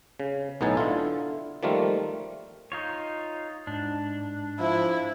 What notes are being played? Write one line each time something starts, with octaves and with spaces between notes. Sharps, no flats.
C#3
B1 A2 B3 D#4 G#5 A5
D3 E4 F4
D#3 F3 G3 A3 A#3 F4
D#4 F4 C#5
G#2 D4
F3 E4